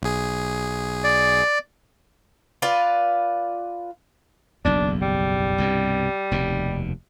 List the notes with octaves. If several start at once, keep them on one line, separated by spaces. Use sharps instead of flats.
B1 G#4
D5
F4 B4 D5 F5
F#1 B1 E2 D4
G3
C2 G2 B2
F1 D#2 B2